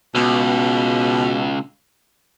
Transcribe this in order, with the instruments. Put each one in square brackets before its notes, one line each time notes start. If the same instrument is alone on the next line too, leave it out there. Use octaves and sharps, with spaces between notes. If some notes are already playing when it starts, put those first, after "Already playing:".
[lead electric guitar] C#2 [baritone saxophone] B2